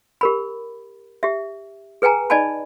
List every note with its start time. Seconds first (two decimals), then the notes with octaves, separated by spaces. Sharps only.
0.21 G4 A#4 B5
1.23 G4 E5
2.02 G#4 B4 G5 G#5 A#5
2.30 D#4 D5 D#5 G#5 A5 B5